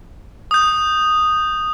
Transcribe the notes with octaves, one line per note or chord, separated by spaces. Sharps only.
D#6 G6